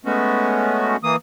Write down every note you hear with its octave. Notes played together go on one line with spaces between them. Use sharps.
G#3 A3 B3 C#4 F#4
E3 A#3 D#6